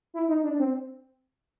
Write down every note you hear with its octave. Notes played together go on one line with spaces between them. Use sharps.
E4
D#4
D4
C4